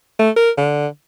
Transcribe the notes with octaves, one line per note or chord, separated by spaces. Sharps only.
A3
A#4
D3